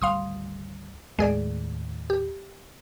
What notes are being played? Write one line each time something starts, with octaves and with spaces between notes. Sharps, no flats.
G#1 D2 G3 F5 C6 D#6
D#2 A2 D#3 G#3 G#4 D5
G4